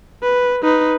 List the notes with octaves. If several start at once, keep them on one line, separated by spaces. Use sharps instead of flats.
B4
D#4 B4